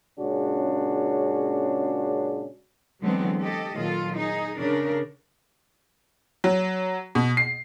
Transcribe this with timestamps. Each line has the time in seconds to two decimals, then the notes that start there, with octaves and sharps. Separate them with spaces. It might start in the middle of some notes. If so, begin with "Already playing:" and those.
0.19 A#2 C#3 G#3 C#4 D4 F#4
3.01 D3 E3 F#3 G#3 B3 C4
3.39 G4 A4 D#5
3.73 A#2 D#3 F#3 F4 A4
4.12 D#4 G#4
4.58 C#3 D4 A#4
6.44 F#3
7.15 B2
7.37 C7